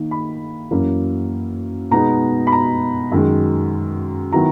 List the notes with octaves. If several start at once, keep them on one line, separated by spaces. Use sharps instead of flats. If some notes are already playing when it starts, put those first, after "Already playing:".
Already playing: D#3 A#3 D#4
B5
F#2 E3 A#3 C#4
B2 G#3 B3 D#4 A#5
B5
A#5
F#2 D#3 G#3
D#3 F#3 B3 E4 A#5